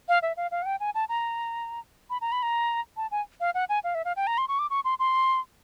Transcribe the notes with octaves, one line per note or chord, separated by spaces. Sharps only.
F5
E5
F5
F5
F#5
G5
G#5
A5
A#5
B5
A#5
B5
A#5
A5
G#5
F5
F#5
G#5
F5
E5
F5
G5
A#5
C6
C#6
D6
C#6
C6
C6